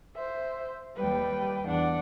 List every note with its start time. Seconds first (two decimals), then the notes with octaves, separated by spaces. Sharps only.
0.15 C5 E5
0.96 D#2 G3 B4 G5
1.67 E2 D4 F#5